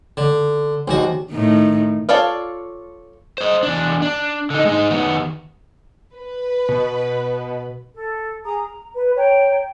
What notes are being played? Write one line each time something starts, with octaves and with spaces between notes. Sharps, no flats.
D3
A#1 D#2 F#4
A2 D#3
F4 A4 C#5 D5 F5
C5 D#5
E2 D4
D4
D3 D#4
G#3 D#4
D#3 B3
B4
B2
A4
G#4 A#5 D#6
A#5
B4
C#5 G5 A#5